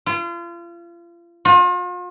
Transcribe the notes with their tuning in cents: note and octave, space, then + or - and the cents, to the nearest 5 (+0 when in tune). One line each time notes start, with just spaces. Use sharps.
F4 -35
F4 +40